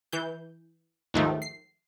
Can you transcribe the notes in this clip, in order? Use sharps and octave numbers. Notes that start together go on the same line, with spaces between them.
E3 G6
D#2 G#2 D#3 F3 A3
C7